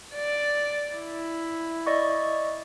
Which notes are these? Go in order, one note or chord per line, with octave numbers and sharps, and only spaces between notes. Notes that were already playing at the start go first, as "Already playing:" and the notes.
D5
E4
D5 D#5 C#6